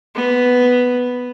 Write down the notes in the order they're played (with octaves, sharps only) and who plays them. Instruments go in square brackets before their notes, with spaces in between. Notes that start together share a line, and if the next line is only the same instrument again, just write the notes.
[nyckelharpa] B3